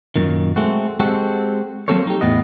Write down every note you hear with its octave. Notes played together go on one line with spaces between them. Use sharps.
F#2 A#2 D#3
G#3 A3 C4 F#4
G#3 C4 F#4 G4 A4
F#3 A#3 C4 A4 C5 C#5
D#4 G4
E2 A2 B3 D#5